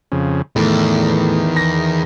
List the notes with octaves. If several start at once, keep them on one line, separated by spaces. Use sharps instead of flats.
F2 C#3
E2 A2 D#3
A#6